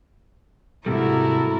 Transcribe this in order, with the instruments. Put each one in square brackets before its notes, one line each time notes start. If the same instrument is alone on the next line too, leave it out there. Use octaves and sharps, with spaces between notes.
[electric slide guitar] G#2 C3 G3 [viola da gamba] E4 F#4 A#4 [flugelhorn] A4